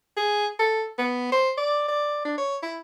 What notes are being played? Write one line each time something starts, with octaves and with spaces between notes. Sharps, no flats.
G#4
A4
B3
C5
D5
D5
D4
C#5
E4